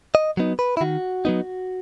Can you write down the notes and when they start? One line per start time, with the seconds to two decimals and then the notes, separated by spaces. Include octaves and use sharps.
0.15 D#5
0.37 F#3 B3 D#4
0.59 B4
0.77 E4
0.81 D#3 F#4
1.25 F#3 B3 D#4